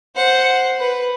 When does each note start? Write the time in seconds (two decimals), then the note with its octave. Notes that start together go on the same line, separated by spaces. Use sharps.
0.16 C5 F#5
0.79 B4